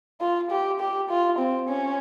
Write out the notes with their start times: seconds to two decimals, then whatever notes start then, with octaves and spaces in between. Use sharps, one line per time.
0.21 F4
0.50 G4
0.80 G4
1.09 F4
1.39 C4
1.68 C#4